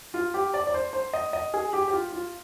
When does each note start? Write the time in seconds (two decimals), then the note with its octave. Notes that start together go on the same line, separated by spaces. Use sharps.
0.14 F4
0.34 G4
0.54 D5
0.67 D5
0.74 C5
0.93 C5
1.13 D#5
1.33 D#5
1.54 G#4
1.73 G4
1.88 G4
1.93 F4
2.13 F4